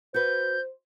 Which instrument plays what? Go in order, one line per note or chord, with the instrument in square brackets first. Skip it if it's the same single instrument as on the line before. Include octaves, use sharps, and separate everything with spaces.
[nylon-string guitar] F#4 B4 [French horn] C5 [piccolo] G6